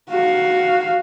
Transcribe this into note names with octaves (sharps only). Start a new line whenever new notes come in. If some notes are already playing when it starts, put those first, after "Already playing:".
F#4 F5